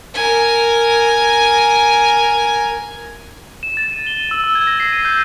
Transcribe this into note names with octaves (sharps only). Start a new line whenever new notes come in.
A#4 G#5
E7
A6
D#7
G7
E6
E6
G#6
A#6
C7
D#7
G6